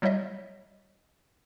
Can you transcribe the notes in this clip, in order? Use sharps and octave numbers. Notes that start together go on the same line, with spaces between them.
F#3 G3 E4 C#5 D#5 E5